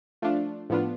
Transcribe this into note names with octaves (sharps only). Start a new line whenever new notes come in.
F3 A3 D4 F4
A2 F3 B3 D4 F4